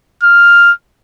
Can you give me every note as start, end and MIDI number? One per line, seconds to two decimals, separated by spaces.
0.23 0.72 89